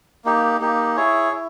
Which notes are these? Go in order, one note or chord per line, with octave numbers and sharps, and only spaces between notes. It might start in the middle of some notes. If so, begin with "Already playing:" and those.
A#3 D#4 G4
A#3 D#4 G4
E4 G#4 C#5
E4